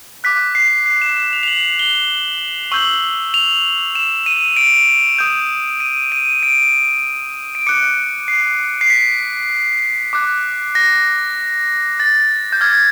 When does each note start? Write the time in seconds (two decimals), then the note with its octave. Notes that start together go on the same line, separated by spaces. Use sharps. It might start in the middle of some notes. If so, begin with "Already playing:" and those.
0.24 D6 F#6 B6
0.55 C7
0.86 C7
1.02 E7
1.17 E7
1.33 F7
1.43 F7
1.48 F#7
1.79 G7
2.72 C#6 E6 G6 F#7
3.34 F7
3.95 E7
4.26 D#7
4.57 D7
5.19 D#6 G6
5.80 D#7
6.12 D#7
6.43 D7
7.55 D7
7.67 D6 F#6 C#7
8.28 C7
8.81 C7
8.90 B6
10.13 D6 F#6
10.75 A#6
12.00 A6
12.52 G6
12.61 D6 F6 G#6